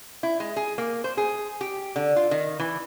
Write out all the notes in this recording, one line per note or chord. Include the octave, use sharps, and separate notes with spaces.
E4
G#3
G#4
A#3
C5
G#4
G4
D3
F4
D#3
E3